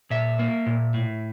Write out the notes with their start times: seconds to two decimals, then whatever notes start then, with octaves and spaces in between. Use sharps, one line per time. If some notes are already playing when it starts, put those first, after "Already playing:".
0.10 A#2 E5
0.39 A#3
0.66 A#2
0.94 A2